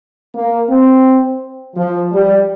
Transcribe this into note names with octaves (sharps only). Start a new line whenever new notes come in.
A#3
C4
F3
G3